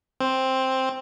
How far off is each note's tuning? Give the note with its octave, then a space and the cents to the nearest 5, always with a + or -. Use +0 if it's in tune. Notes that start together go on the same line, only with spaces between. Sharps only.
C4 +5